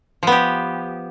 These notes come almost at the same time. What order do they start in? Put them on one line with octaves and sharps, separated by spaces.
F3 B3 G4